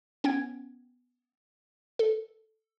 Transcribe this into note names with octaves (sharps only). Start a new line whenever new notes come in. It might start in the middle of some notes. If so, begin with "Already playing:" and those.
B3 C#4 G5 G#6
A4